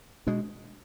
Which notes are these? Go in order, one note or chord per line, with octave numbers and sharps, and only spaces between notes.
B2 G#3 D4